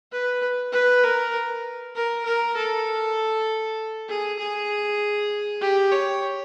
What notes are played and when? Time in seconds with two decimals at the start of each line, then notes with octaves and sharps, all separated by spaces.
0.12 B4
0.72 B4
1.04 A#4
1.95 A#4
2.25 A#4
2.56 A4
4.09 G#4
4.39 G#4
5.61 G4
5.92 C#5